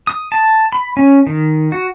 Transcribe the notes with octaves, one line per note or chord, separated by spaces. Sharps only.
D#6
A5
B5
C#4
D#3
F#4